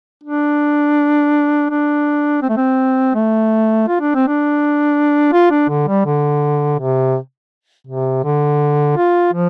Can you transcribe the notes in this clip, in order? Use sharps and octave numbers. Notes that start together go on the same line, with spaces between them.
D4
D4
C4
A3
C4
A3
F4
D4
C4
D4
F4
D4
D3
G3
D3
C3
C3
D3
F4
F3